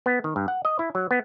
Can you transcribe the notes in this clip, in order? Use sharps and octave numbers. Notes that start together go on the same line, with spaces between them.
B3
D#3
G2
F#5
D#5
E4
F#3
B3